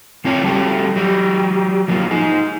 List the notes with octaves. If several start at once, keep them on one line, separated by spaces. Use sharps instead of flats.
C#3 C4 F4 C#5 A5
G3 F#4 G4 A4
F#3 G4
F3 F#3 A#3 F4
D#4 G#4